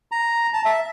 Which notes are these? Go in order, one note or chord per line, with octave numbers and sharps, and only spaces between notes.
A#5
A5
E5